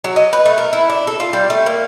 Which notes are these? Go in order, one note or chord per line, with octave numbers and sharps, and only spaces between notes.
F#3
D#5
B4
A3
A#4
E4
D4
A4
F4
G3
A3
A#3